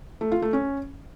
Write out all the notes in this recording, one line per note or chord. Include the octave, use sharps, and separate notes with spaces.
A3
F4
A3
C#4